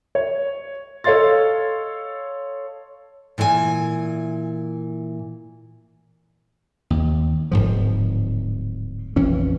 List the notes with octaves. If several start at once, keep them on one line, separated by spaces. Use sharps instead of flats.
C#5
A4 C#5 D#5 F5 C6 A6
A#2 E3 A#4 C5 G#5
D#2
D1 C2 G#2 F3
A#1 F2 E3 C#4